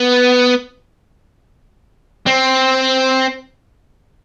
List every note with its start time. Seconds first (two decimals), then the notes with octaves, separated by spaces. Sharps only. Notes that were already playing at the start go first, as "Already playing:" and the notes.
Already playing: B3
2.27 C4